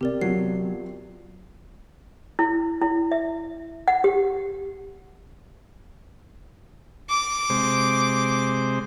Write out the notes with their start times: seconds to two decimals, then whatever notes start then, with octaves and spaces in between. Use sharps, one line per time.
0.01 C3 G4 A#4 D5
0.21 E2 C3 F3 F#3 C7
2.39 E4
2.82 E4
3.12 E5
3.88 F#5
4.04 G4
7.10 D6
7.50 C3 G#3 C5